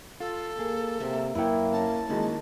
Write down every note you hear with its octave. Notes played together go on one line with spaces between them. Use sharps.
F4 A4
A#3 G#4
C3 A#3 E5
F#2 A#3 E4 B4 C#5 G5
C#4 A5 A#5
D#3 G#3 A#3 E4 F#4